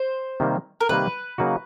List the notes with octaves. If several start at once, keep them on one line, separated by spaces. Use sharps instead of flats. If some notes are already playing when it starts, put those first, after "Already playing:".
Already playing: C5
C3 D#3 G3 A#3
A#4
C3 D#3 G3 A#3 B4
C#3 F#3 A#3 D#4 F#4